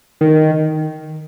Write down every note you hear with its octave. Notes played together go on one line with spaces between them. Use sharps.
D#3